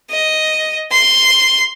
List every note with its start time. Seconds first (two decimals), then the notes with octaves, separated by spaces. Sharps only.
0.11 D#5
0.92 C6